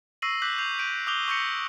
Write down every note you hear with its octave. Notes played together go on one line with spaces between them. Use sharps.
C#6 E6 A#6 C7 D#7 F#7
D6 F#6 G6 B6 F#7
G6 C7 F7
G6 D7 D#7
D6 D#6 F#6 G6 F7 G7
C#6 E6 G6 A#6 C#7